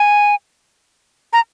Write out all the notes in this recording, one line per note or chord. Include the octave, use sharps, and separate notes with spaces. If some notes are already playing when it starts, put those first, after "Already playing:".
Already playing: G#5
A#5